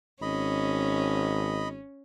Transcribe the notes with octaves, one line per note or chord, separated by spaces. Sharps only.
G#1 C#4 D#5 B5